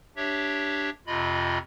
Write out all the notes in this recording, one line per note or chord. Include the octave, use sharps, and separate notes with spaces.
D4 G4 C#5 E5
F2 C3 F4 D#5 B5